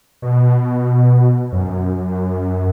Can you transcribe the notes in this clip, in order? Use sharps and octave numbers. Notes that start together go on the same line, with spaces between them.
B2
F#2